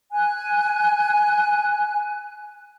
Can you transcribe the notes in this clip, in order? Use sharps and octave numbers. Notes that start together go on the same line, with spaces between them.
G#5 F#6